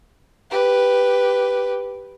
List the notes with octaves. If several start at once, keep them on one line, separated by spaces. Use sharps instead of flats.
G4 B4